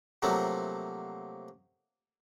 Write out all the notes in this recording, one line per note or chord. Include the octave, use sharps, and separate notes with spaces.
C3 F3 F#3 A3 A#3